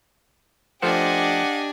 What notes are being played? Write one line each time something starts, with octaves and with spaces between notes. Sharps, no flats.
F3 A3 D4 G4 C5 D#5 F#5 G#5